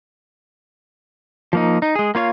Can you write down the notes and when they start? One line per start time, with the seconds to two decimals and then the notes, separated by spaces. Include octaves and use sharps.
1.53 F3 A#3 D#4
1.82 D#4
1.95 G#3 G#4
2.15 A#3 F4 C#5 F5